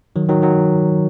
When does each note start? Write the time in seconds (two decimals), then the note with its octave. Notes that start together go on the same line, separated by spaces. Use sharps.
0.16 D#3 F#3
0.29 D#3 F#3
0.42 D#3 F#3